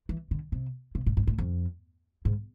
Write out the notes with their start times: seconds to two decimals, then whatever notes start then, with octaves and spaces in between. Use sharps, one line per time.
0.09 E3
0.31 D3
0.52 C3
0.95 C3
1.06 A2
1.17 G#2
1.27 A2
1.38 F2
2.25 G#2